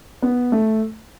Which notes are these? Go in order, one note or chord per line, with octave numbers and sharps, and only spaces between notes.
B3
A3